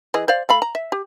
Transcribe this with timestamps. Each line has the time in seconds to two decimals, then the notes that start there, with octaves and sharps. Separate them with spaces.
0.14 E3 G#4 D#5
0.28 C5 D5 F5
0.49 A3 F5 B5
0.62 A#5
0.75 E5
0.92 G4